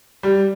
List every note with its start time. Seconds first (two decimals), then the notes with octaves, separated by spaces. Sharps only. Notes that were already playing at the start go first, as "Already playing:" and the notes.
0.23 G3